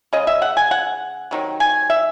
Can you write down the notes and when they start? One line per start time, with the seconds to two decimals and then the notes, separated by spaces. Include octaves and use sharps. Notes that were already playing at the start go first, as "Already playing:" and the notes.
0.13 C#3 G#3 D#5
0.27 E5
0.42 F#5
0.57 G#5
0.71 F#5
1.31 C3 D#3 F#3
1.60 G#5
1.90 E5